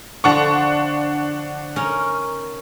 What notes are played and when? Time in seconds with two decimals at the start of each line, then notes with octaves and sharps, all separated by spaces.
0.24 D3 F3 D4 F#5 C#6
1.76 C#4 D#4 A#4